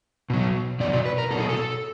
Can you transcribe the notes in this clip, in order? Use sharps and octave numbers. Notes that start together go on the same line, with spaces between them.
B2 F#3
B2 F#3 D5
D5
B4
A#4
B2 F#3 A4
G#4
A4